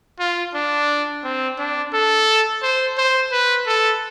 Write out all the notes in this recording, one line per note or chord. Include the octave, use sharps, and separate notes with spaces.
F4
D4
C4
D4
A4
C5
C5
B4
A4